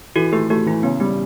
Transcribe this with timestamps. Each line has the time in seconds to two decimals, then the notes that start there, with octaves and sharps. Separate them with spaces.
0.16 E3 F#4 A4
0.33 A3 G4
0.50 A3 F#4
0.66 E3 E4
0.83 C#3 B3
1.00 G3 B3